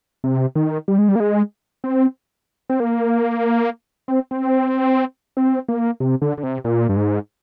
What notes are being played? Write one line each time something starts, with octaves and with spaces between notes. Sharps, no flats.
C3
D#3
G3
G#3
G3
A#3
G#3
C4
C4
A#3
C4
C4
C4
A#3
C3
D3
D3
C3
A#2
G2
G#2